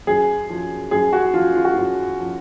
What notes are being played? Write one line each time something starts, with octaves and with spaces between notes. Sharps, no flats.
F#2 G#4
F3
F#2 G#4
F#4
F3 F4
F4
F#4
F#2 F4
F3